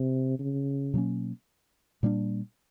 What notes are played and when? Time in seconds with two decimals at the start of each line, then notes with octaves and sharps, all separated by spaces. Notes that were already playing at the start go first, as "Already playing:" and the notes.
Already playing: C3
0.39 C#3
0.94 B2 F#3 A#3 C#4
2.03 A#2 G3 A#3 D4